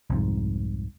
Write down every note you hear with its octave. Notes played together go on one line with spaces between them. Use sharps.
C2 F2 G#2